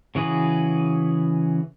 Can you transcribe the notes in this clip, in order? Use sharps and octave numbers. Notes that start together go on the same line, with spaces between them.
C#3 E3 F#4 G#4 B4